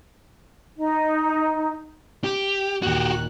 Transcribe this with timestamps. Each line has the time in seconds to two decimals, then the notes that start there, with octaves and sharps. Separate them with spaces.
0.77 D#4
2.24 G4
2.82 D#2 A#2 F#4 G4 F#6